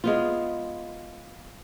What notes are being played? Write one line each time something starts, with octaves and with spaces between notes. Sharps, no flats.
G#3 B3 F4